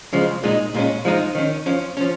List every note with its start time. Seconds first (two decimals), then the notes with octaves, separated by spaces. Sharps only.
0.13 C#3 F3 G#3
0.43 A#2 G#3 D#4
0.74 A#2 G#3 C#4
1.05 F3 G#3 D#4
1.35 D#3 C#4
1.66 F3 C#4
1.97 F3 C#4